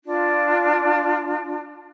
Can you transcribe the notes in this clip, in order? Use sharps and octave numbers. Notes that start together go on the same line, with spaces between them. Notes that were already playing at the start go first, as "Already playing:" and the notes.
D4 F4